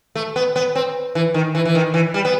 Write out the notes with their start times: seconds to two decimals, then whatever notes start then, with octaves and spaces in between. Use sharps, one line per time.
0.15 A3
0.36 B3
0.56 B3
0.75 C4
1.15 E3
1.34 D#3
1.55 E3
1.65 E3
1.75 D#3
1.94 E3
2.14 G3
2.25 B3